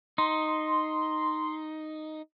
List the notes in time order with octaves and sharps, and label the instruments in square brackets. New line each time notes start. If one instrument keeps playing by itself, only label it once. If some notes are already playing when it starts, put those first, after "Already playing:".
[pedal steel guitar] D#4 [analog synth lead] C6